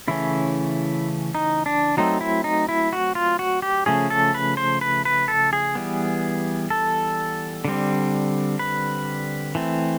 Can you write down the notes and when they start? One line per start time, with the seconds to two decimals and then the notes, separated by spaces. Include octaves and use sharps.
0.08 C#3 E3 A3 C#4 E4
1.35 D#4
1.66 D4
1.97 F#3 A3 C4 D#4
2.21 E4
2.44 D#4
2.69 E4
2.93 F#4
3.15 F4
3.39 F#4
3.62 G4
3.86 C#3 F3 A3 C#4 G#4
4.10 A4
4.35 B4
4.57 C5
4.81 B4
5.05 B4
5.28 A4
5.53 G#4
5.75 E3 G3 B3
6.70 A4
7.65 D3 G3 C4
8.59 B4
9.55 E3 A3 C4